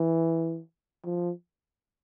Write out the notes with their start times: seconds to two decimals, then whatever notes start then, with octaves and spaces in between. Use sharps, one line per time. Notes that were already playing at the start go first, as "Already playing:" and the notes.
Already playing: E3
1.04 F3